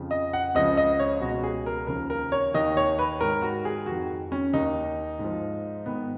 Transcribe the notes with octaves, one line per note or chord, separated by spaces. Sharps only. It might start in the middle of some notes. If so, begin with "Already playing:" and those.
Already playing: F2 C#3 F3
D#5
F#5
C#2 C#3 F3 D#5
D#5
C#5
C#2 B2 F#4
G#4
A#4
D#2 C#3 F3 A#4
A#4
C#5
D#2 D#3 D#5
C#5
B4
G#2 D#3 A#4
F#4
G#4
F2 D#3 F#4
C#4
D#2 D#3 D#4
G#2
F3
G#2 D#3 B3